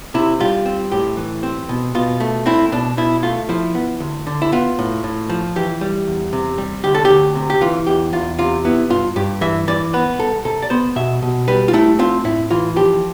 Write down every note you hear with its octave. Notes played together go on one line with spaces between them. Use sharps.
C3 E4
G3 F4
C4
A2 G4
E3
C4
B2
B2 F4
A3
C4 E4
B2 D4
B2 E4
A3 F4
F3 E4
B3
D2
D3
E4
B3 F4
A2
A2
F3
E3 G4
G3
E2
C3
G3
D2 G4
A4
G4
D2
C3
G4
E3 F4
E2 G4
E2 F4
C3 F4
B3 E4
G2 F4
G2 G4
E3 E5
E3 D5
B3 B4
C2 A4
C3 A4
D5
B3 C5
B2 E5
B2
G3 B4
F4
A3 E4
C4 F4
A2 E4
E3 F4
F3 G4